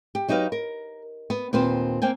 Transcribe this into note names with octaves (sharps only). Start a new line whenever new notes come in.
G4
F#3 D#4 G4 B4 F5
A#4
B3
D#2 A#2 C4 B4 C5
A#3 C4 G5 G#5